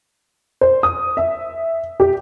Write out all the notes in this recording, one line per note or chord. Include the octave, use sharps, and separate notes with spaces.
C5
D#6
E5
G4